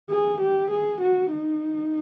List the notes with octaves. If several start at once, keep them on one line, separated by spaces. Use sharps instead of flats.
G#4
G4
G#4
F#4
D#4